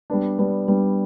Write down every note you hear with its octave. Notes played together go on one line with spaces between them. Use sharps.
G3 B3 D4
G3 B3 D4
G3 B3 D4